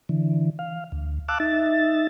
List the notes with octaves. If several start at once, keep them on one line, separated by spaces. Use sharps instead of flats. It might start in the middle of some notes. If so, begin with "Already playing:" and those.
D3 E3
F5
D2
F5 A5 D6 E6 F#6
D#4 E5 A6